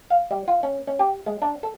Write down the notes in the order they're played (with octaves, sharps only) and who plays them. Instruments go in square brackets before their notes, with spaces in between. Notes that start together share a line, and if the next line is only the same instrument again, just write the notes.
[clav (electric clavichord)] F5
G3
F4
C#4
C#4
G4
G#3
D4
A4